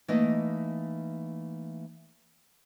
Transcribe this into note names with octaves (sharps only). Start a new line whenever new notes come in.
E3 A3 A#3 D#4 D#5